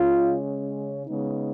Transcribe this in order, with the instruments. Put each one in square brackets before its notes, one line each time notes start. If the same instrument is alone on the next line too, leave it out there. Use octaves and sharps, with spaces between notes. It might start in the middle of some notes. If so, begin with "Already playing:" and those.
Already playing: [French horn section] C#3 G#3 C#4 F4
C#3 G#3 B3 D#4